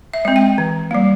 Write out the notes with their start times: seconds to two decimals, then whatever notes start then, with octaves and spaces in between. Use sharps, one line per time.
0.14 E5
0.25 G#3 C4
0.36 G5
0.58 E3
0.91 G3 A#3